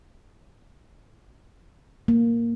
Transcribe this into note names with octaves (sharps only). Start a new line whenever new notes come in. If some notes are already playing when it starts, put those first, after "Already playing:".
A#3